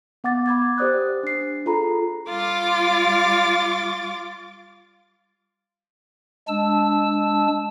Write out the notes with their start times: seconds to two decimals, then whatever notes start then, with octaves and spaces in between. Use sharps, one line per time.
0.24 B3 F#5 D6 A6
0.46 B5 D6 G#6 A6
0.78 G4 C5 D5 D#6 F#6
1.23 D4 C7
1.66 F4 G#4 A4 A#5 B5
2.29 G3 F4 D6 A6
6.48 G#3 D4 A5 E6